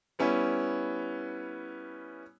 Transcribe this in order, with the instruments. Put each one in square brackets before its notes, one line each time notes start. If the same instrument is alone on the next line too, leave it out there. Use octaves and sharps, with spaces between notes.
[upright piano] G3 B3 C#4 E4